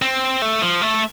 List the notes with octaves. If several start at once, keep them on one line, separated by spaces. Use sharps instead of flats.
C4
A3
F3
A3